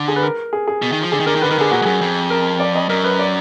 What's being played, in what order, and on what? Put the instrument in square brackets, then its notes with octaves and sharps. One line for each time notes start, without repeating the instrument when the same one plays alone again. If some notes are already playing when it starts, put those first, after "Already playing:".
Already playing: [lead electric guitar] D3
[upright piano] G#4
B4
A#4
G#4
G#4
[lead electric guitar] B2
D#3
F3
[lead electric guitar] D3 [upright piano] G#4
[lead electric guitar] D#3
[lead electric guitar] D3 [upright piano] A#4
[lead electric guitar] D#3
[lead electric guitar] D3 [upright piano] B4
[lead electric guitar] D#3 [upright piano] A#4
[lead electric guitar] D3 [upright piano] G#4
[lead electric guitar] A#2 [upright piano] F#4
[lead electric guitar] G#2
[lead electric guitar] F#2 [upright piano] G#4
[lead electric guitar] F2
[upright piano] A#4
D5
D#5
[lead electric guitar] F#2 [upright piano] A#4
[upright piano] B4
D5